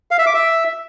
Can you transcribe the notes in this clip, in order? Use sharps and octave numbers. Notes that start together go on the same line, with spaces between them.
F5
E5
D6
E5